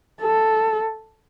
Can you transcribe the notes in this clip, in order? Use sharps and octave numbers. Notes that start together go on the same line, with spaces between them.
A4